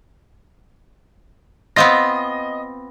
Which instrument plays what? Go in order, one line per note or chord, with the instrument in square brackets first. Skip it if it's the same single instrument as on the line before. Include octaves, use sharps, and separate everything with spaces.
[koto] B3 C4 F4 [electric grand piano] D#5 A#6